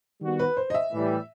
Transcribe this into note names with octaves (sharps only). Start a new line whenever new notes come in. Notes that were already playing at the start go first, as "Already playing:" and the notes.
D#3 G3 B3 F#4
B4
C5
D#5
E5
A2 E3 G3